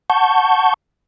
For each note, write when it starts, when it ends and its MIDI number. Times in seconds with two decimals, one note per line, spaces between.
0.10 0.74 78
0.10 0.74 81
0.10 0.74 85
0.10 0.74 91